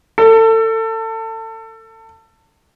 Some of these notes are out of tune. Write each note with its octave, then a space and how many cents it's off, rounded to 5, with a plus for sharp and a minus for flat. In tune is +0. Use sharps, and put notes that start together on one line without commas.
A4 +30